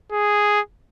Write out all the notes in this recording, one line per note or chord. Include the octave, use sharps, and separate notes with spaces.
G#4